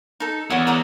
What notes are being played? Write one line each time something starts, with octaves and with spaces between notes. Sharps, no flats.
D#4 A4
E2 C#5 F#5 B5
B4 A#5 D#6